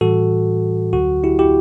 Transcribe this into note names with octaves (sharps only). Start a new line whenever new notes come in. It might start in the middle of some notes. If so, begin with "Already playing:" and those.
A2 E3 G3 F#4 A4
D2 D3 F#3 F#4
E4 G4
E4 G4